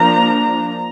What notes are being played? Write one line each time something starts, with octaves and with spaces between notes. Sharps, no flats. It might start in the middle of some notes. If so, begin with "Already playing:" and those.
Already playing: F3 A#3 D4 A#5